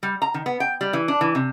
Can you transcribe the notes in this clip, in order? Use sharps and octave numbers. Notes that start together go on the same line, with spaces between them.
G3
A#5
D#3
B3
G5
G3
E3
D4
E3
C3